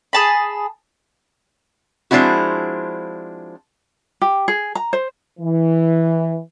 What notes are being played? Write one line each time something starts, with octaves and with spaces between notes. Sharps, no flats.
G#4 A5 B5
F3 G#3 C4 D4 E4 F#4
G4
G#4
A#5
C5
E3